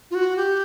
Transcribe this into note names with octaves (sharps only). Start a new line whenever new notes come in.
F4
F#4
G4